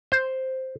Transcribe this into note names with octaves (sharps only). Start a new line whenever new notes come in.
C5